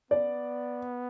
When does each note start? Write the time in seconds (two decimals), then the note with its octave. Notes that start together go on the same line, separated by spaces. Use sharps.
0.11 B3 D5